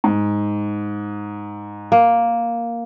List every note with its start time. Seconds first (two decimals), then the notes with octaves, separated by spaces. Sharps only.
0.04 G#2
1.92 A#3